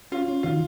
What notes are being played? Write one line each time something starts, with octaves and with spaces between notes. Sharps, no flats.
C#4 F4
C#4
D#3 F4